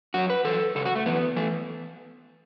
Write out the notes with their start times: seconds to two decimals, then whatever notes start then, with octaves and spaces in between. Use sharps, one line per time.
0.14 F#2 F#3 F#4
0.30 B4
0.45 F#2 C#3 E3 A4
0.75 F#2 C#3 A4
0.86 F#4
0.95 A3
1.06 F#2 E3 B3
1.36 E3 A3